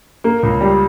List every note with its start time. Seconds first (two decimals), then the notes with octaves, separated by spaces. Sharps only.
0.24 A#3
0.43 C#2
0.61 G3